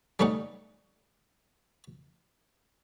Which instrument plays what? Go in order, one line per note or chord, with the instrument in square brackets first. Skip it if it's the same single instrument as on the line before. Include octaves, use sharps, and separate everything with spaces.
[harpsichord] G3 A3 C#4 D#4 F#5